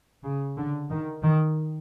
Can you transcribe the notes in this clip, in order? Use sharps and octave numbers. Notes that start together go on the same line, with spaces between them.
C#3
D3
D#3
D#3